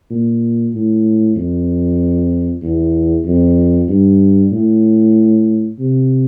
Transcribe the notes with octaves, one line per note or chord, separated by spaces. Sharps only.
A#2
A2
F2
E2
F2
G2
A2
C3